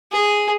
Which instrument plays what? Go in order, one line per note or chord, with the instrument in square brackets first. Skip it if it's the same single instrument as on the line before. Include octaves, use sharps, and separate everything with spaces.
[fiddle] G#4